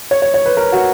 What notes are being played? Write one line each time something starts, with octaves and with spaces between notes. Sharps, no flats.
C#5
C#5
C#5
B4
A#4
F#4